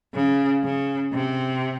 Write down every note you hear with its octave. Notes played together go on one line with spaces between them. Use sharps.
C#3
C#3
C3